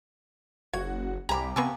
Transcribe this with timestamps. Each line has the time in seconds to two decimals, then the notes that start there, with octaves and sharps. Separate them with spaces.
0.73 F#1 F#4 C#5 G#6
1.29 C2 G4 G#5 A#5 B5 D6
1.56 C3 A#3 B3 G#5 A5 C#6 E6